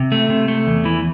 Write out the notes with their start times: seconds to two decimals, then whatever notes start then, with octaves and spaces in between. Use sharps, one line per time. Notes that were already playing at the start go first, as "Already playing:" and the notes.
Already playing: C3
0.12 A3
0.30 C3
0.48 A3
0.67 E2
0.85 E3